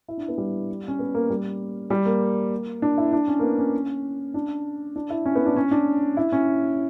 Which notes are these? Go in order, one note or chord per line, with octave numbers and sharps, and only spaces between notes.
E4
D4
B3
G3
C#4
B3
A#3
G3
G3
A#3
D4
E4
D4
C#4
A#3
B3
C#4
D4
D4
E4
C#4
B3
D4
C#4
D4
E4
C#4